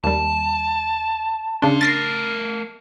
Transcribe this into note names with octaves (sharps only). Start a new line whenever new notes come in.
D#2 G3 A5
C#3 D4 A#4 C6
A3 A#4 A6 A#6 C7